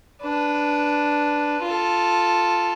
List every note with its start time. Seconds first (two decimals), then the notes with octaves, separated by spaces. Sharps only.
0.22 D4 B4
1.63 F4 A4